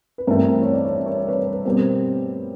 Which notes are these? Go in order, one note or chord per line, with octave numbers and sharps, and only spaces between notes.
B4
G2 E3 A3 C4 A#4 C5
C#5
D5
C#5
D5
C#5
D5
B4 C#5
B4
B2 G3 C4 A#4 C5